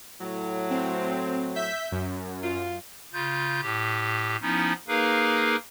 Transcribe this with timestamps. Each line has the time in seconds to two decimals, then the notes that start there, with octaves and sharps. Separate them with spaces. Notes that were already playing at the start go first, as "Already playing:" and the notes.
0.20 A2 F#3
0.70 C4
1.55 E5 G6 B6
1.92 F#2
2.44 F4
3.13 C#3 F4 G6
3.62 A2 G4
4.42 F3 B3 C#4 D#4 E4
4.88 A#3 D#4 G#4 A#4 B4 F5